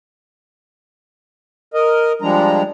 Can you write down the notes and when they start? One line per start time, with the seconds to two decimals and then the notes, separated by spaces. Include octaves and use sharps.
1.74 A#4 D#5
2.22 F3 G3 G#3 D4 A#5